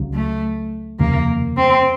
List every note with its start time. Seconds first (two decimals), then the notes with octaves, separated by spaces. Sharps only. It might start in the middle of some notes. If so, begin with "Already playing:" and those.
Already playing: C#2 C#3 F#3
0.14 A3
0.99 F1 D#2 C#3 F3 A#3
1.57 C4